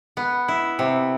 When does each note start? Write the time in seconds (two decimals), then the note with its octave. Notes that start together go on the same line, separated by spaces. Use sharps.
0.17 B3
0.48 E4
0.79 C3